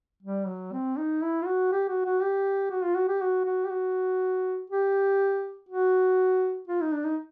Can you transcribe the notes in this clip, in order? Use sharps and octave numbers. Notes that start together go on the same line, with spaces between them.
G3
F#3
C4
D#4
E4
F4
F#4
G4
F#4
F#4
G4
F#4
F4
F#4
G4
F#4
F#4
G4
F#4
G4
F#4
F4
D#4
D4
D#4